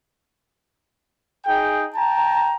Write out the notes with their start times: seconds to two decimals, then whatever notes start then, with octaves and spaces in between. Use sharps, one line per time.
1.45 D#4 G#4 G5
1.95 G5 A5 A#5